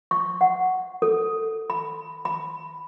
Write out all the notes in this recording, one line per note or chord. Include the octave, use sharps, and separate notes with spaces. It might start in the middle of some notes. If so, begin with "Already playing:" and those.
C#6
F#5
A4
B5
B5